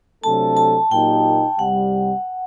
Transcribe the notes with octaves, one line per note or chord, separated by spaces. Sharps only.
C3 F#3 A3 D4 A4 A5
A5
A#2 F#3 A#3 D#4 G4 G5
C2 C3 G3 F#5